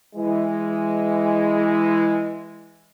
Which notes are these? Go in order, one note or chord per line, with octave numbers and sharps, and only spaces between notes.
E3 G#3